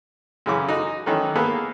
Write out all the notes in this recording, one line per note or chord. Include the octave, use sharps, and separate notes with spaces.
F#2 C#3 E3 D6
D#4 F#4
D#3 E3 F#3 A3 C#4 D#4
A#3 B3 G#4 A4 B4